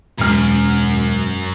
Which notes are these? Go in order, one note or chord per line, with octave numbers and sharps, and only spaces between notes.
E1 F#2 F6